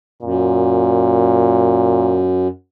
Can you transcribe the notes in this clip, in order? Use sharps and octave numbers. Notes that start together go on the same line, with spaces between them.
F#2 A#2